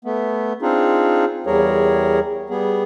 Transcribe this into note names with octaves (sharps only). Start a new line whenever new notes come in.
A3 B3
C4 D4 D#4 F4 G#4
E2 G3 G#4 A#4 C#5
G3 B3 G#4